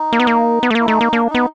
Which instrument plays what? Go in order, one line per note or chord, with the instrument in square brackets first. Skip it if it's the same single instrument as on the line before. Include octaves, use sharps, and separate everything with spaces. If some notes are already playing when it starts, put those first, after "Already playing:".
Already playing: [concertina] D#4
[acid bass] A#3
B3
A#3
B3
A3
A#3
[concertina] E4
[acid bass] A3 [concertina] D#4
[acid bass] A#3
[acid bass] A#3 [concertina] D4
[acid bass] B3 [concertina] D#4